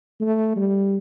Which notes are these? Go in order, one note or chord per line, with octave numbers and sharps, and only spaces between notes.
A3
G3